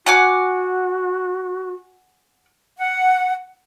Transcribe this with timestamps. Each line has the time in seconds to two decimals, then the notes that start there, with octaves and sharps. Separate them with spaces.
0.06 F#4 F#5 G#5 D6
2.77 F#5